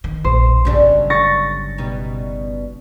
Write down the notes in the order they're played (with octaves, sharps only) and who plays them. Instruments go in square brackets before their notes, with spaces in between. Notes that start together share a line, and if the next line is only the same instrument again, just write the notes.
[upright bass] D#3
[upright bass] A#1 [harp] C5
[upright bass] G1 C#3 [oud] F#3 G3 D4
[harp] C#6 A6 A#6
[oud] B2 G3 D#4